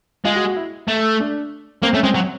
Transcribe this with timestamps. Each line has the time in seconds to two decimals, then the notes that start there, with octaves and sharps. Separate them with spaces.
0.25 G#3 F4
0.36 F#4
0.46 F#4
0.56 E4
0.88 A3
1.20 D4
1.83 A#3 C4
1.93 A3 C#4
2.03 G#3 C4
2.15 F#3